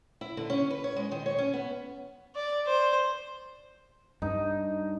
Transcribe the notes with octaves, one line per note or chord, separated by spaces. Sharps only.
E4
D3
C#4
B4
C#5
G#3
D#3
C#5
C#4
B3
D5
C5
G2 D#4